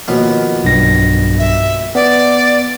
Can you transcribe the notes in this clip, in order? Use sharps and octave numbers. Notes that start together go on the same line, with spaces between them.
D#2 B2 F3
B1 G2 A#6
E5
B3 D5